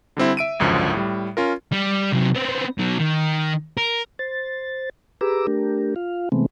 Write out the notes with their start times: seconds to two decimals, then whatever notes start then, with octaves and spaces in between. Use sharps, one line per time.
0.17 D3 G3 C4 E4
0.37 E5 D7 D#7
0.60 G#1 C#2 F#2 D3 F3
0.93 A2 G3
1.37 C#4 F4 A#4
1.72 G3
2.12 C3 F#3
2.35 B3 C4
2.78 B2 F#3
2.99 D#3
3.77 A#4
4.19 C5 A6
5.21 G4 G#4 B4 A#5 D6 E6
5.47 A3 D4 G4 A#4
5.96 F4 F5
6.32 C3 E3 G#3 A3 B3 C4